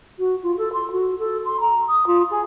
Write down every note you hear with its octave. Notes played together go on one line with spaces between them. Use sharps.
F#4
F4
A4
C6
F#4
A4
C6
A#5
D#6
F4
G#4